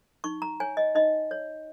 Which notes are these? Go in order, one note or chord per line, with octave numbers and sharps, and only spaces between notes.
D#4 C#6
A#5
C#5 G#5
D#5
D#4 D#5
C#5